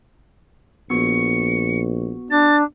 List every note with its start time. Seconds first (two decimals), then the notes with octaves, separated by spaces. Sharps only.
0.90 A#1 B3 F#4 C#6 C#7
2.30 D4 A6